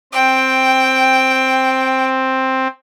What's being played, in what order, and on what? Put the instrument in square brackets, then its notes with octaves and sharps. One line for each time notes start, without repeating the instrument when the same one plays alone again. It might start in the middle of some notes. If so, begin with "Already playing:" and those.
[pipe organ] C4 [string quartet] G5